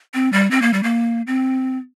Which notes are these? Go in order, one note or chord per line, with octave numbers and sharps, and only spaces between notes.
C4
G3
C4
A#3
G3
A#3
C4